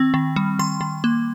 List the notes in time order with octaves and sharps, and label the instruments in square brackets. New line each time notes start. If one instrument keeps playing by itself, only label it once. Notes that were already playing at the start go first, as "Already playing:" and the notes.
Already playing: [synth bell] D#3 C4
D#3
G3
D#3 C6
D#3
A#3